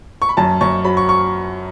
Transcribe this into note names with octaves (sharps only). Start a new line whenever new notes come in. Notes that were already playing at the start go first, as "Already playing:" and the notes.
C#6
B5
F#2 A5
F#2 C#6
F#3 B5
C#6
C#6